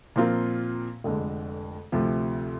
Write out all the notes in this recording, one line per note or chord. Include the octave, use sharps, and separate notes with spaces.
A#2 F3 C4 F4 A#4
F1 F2 D3 G#3
D2 C3 F3